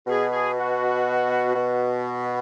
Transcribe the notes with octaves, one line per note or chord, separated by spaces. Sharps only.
B2 G#4
G#4
F#4
B2